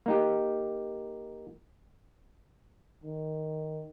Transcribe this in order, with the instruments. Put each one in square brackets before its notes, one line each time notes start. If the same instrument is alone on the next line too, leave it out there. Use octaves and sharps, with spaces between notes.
[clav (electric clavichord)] A#3 D#4 G4
[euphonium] D#3